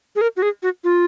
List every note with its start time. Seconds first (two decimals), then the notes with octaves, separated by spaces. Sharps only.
0.16 G#4
0.21 A#4
0.37 F#4
0.42 G#4
0.63 F#4
0.84 F4